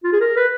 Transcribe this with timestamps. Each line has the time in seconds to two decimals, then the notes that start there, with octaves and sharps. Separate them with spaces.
0.04 F4
0.13 G#4
0.20 A#4
0.36 B4